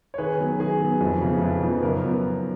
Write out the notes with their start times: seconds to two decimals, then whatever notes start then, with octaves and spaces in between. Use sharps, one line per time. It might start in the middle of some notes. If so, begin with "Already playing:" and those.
0.14 C#5
0.18 D#3 G#4 B4
0.39 F#3 B3
0.60 D#3 G#4
0.80 F#3 B3
1.01 F2
1.22 C#3 F3 B3 D#4
1.42 F2
1.62 C#3 F3 B3 D#4
1.83 F#2 A#4
2.04 F3 B3 D#4
2.25 F#2